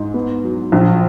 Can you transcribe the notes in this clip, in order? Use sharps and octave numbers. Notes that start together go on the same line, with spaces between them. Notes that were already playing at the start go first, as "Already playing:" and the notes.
Already playing: G#2 D#4
B3
F#3
A#1